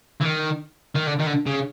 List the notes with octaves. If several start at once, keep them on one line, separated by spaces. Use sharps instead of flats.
E3
D#3
D#3
D3
D#3
D3
C#3